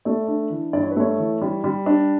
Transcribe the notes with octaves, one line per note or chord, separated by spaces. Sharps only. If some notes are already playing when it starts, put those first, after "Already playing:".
A3 D5
D4
E3
G2 D5
C#5
B4
A3 C#5
E3
G3
G3
D4